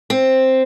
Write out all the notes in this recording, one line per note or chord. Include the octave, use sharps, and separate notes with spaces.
C4